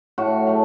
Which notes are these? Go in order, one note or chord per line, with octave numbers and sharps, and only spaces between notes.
A2 F#4
F#3 A3